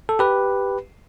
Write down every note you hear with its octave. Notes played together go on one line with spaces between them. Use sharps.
A4
G4 B4